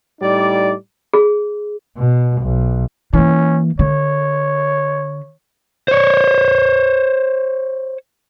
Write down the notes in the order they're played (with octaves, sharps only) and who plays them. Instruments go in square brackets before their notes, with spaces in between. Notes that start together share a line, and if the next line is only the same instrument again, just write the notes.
[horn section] A2 G3 D#4 D5
[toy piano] G#4
[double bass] B2
B1
[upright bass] E3 A#3 [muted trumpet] C#4
[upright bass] D3 [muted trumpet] C#5
[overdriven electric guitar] C5 C#5